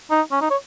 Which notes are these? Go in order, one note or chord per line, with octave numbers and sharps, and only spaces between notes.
D#4
C#4
D#4
C#5